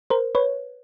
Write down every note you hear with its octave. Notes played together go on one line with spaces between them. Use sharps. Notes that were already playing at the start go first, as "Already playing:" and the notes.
A#4 C5
B4 C#5